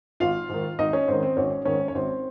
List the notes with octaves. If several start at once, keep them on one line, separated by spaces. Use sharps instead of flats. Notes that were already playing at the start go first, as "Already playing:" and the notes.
G#1 F4 F5
G#2 D#3
G#1 D#4 D#5
C#4 C#5
G#2 D#3 C4 C5
C4 C5
G#1 C#4 C#5
G#2 D#3 C#4 C#5
C#5
G#1 C4 C5